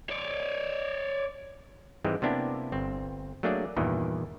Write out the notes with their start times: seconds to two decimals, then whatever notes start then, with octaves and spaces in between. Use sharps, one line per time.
0.09 C#5 D5
2.04 G#2 E3 G3 G#3 C4
2.22 C3 A#3 B3 D4 E4 G4
2.72 G1 C4
3.43 F#3 A3 A#3 D4 G#4 D5
3.77 E2 G2 A#2 D#3 E3